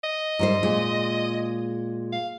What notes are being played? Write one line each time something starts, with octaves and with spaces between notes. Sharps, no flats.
D#5
G#2 G3 C5
A#2 G#3
F5